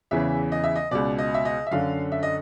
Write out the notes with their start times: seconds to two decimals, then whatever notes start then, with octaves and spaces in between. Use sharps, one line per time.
0.11 E2 C#3 E3 E5
0.52 D#5
0.64 E5
0.76 D#5
0.91 C#2 B2 D5
1.18 D#5
1.34 E5
1.45 D#5
1.67 E5
1.71 F#2 D3 F5
2.12 E5
2.23 D#5